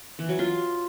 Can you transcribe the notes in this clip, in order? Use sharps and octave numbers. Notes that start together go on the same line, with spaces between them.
E3
F#3
F4